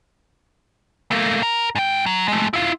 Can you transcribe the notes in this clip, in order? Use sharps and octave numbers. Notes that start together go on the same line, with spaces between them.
A3 A#3
A#4
G#2 G5
F#3
G#3 A3
E4 F4